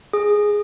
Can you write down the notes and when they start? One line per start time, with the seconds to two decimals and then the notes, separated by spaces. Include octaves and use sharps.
0.13 G#4